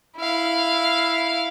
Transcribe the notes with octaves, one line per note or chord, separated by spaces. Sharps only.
E4 F5